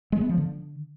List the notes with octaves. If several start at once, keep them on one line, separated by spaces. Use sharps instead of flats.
G#3
B3
F3
D3